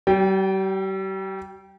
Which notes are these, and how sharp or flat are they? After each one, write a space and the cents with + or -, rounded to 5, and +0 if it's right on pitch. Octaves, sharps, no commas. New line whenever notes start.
G3 -40 G5 +0